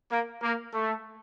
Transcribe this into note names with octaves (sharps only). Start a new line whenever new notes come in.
A#3
A#3
A3